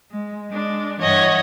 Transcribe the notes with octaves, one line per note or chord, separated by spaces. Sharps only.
G#3
G#3 D4
G2 E3 C#5 D#5 F#5